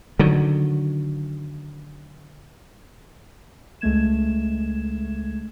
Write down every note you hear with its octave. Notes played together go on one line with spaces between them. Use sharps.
D3 D#3 F#3
C#2 G#3 A3 G#6 E7